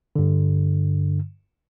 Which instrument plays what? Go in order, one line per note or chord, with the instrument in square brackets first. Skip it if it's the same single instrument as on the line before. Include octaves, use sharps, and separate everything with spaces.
[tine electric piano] G2 D3